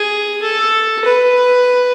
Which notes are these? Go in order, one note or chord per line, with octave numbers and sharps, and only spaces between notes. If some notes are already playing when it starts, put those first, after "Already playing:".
Already playing: G#4
A4
B4